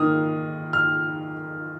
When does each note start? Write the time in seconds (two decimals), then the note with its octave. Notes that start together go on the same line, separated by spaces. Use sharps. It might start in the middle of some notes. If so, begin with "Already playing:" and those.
Already playing: D#3 A#3 D#4 D#6 F6
0.73 F6